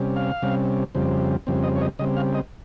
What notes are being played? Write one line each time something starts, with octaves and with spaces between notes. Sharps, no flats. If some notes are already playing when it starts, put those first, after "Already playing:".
Already playing: C3 G3 C#4
F5
C3 G3 C#4
F2 C#3 G3 C4
F2 C#3 G3 C4
D#5
C#5
D#5
C#3 G3 C4 D#5
F5
D#5